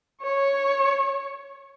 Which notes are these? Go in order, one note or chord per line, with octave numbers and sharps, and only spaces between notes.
C#5 C#6